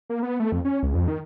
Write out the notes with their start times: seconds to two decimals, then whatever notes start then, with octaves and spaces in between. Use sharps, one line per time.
0.10 A#3
0.23 B3
0.40 A3
0.52 F2
0.65 C#4
0.83 C#2
0.95 F2
1.08 D#3